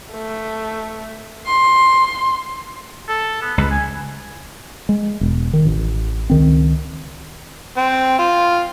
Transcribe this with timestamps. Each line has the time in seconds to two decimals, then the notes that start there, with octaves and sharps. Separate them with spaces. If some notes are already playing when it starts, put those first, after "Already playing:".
0.12 A3
1.46 C6
3.08 A4
3.42 B3
3.58 C#2 B4
3.71 G#5
4.89 G#3
5.21 E1
5.53 D#3
5.65 A1
6.30 C#2 D#3 C4
7.78 C4
8.19 F4